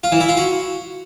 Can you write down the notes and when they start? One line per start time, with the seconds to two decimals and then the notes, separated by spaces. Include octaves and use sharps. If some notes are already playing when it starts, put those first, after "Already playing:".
0.04 F4
0.12 E3
0.20 E4
0.29 F4
0.37 F#4